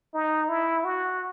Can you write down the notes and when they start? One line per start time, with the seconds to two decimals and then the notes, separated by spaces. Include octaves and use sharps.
0.14 D#4
0.49 E4
0.84 F#4